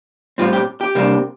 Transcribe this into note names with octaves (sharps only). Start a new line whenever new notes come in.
A2 G3 C4 F4
G4
G4
C3 G3 A#3 D4